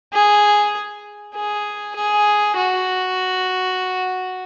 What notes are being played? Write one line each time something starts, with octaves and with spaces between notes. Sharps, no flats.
G#4
G#4
G#4
F#4